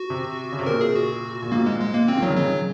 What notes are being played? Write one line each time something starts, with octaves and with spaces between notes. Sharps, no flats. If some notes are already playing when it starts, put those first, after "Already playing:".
Already playing: F#4
C3
C#3
C3
A#2 A#4
G#4
F#4
A#2
G#2 A#3
G#3
G#3
A#3
A#2 C4
D#3
C#3 F#3
C#3 F#3